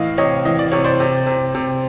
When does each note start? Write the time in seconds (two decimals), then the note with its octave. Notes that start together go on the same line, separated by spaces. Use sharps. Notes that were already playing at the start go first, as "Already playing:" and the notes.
Already playing: A2 E3 D#5 F5
0.18 C3 C#5 D#5
0.45 E3 D#5
0.59 D5
0.72 C3 C#5
0.84 C5 D5
1.00 C3
1.27 C3
1.55 C3